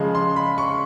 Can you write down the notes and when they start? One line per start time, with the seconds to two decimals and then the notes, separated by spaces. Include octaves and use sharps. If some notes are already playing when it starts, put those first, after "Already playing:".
Already playing: C#3 F3 G#3
0.15 C6
0.36 B5
0.58 C#6